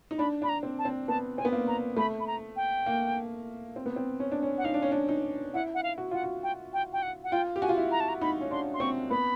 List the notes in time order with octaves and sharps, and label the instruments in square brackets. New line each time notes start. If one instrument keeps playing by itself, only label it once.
[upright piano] D#4
[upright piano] D4 [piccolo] B5
[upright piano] D4 [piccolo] B5
[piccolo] A#5
[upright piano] C4
[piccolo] A5
[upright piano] C4
[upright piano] B3 [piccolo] A5
[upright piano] C4 [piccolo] G#5
[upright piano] B3
A#3
[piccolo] A#5
[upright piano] A3 [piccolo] B5
[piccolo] B5
A#5
G5
[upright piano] A#3
C4
B3
C4
C#4
D4
C#4
[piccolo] F#5
[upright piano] D#4 [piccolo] F5
[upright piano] D4
C#4
D4
D#4
[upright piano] E4 [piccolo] F#5
[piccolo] F#5
F5
[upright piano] F#4
[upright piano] F4 [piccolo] F#5
[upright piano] F#4
[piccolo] G5
G5
G5
F#5
F#5
[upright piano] F4 [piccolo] G5
[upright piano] G4
[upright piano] F#4 [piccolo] G#5
[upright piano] F4
E4
[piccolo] A#5
A5
A#5
[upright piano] D#4 [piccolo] B5
[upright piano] C#4
[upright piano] D4 [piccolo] C6
[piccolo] C6
[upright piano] C4 [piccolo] C#6
[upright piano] B3 [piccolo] B5